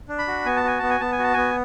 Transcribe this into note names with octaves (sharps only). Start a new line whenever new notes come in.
D4
B5
F#4
B3 G#5
A5
F#4 G#5
B3 A5
G#5
B3 A5
G#5
F#4 A5
B3 G#5